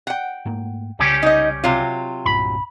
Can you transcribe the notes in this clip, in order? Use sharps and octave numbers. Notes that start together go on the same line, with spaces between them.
F#5 G5
G#2 A3 A#3
C2 C#3 G3 C#4 G4
D#4 D#5
C3 F#3 F4
C2 G2 A#2 B5